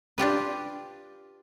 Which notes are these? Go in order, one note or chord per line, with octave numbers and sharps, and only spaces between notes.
D4 F4 G4 B4